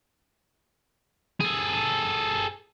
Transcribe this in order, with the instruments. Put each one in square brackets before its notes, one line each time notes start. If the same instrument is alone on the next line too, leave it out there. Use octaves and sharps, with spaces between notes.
[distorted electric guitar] G#4 A4